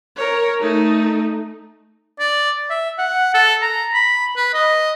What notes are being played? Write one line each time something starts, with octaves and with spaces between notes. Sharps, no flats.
A#4 C#5
A3 D#4
D5
E5
F#5
A4
A#5
B5
B4
D#5